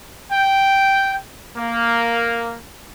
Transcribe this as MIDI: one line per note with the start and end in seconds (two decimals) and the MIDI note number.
0.31 1.15 79
1.56 2.56 58